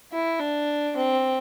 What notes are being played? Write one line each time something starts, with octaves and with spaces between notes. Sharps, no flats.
E4
D4
C4